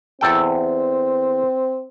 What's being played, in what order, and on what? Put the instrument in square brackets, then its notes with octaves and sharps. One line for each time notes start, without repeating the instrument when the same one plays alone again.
[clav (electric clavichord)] E2 A4 G5 [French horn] C4